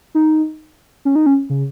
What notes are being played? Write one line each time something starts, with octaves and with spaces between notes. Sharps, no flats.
D#4
C#4
D#4
C#4
C#3